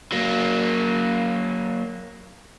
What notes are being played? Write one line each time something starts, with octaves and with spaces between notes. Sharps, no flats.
F#3 A#3